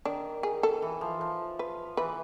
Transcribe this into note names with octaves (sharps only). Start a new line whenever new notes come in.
D#3 D4
G#4
A4
E3
F3
F3
B4
E3 B4